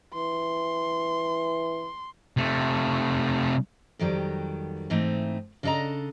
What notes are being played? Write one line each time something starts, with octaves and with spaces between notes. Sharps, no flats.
E3 C6
C3 A3
F2 D#3 F#3 G3
G#2 E3 A3 C4 D#4
C#3 D4 A4 D#5 A#5